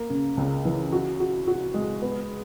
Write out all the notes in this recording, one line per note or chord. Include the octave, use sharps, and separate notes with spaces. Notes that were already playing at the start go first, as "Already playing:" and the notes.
Already playing: A#3
C#3
C#2
E3
F#4
F#4
F#4
G#3
B3